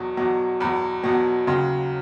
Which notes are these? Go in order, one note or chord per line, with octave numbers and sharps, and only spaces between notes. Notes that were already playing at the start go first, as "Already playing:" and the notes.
Already playing: E2 B2 F#3
E2 B2 F#3
E2 B2 F#3 B5
E2 B2 F#3
D#2 C#3 F#3 C6